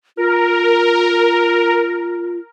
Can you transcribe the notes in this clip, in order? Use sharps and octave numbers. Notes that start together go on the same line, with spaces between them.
F4 A#4